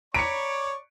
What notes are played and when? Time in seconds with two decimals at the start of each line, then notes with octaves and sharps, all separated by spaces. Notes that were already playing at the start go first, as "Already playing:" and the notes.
0.14 C#5 D5 A#5 B5 C#6 C#7 D7